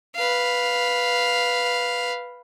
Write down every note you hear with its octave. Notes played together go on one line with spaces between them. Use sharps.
B4 F5